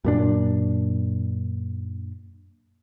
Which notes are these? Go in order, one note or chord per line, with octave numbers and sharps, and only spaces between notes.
F#2 A#2 D4